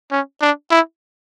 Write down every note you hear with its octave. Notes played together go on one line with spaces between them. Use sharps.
C#4
D4
E4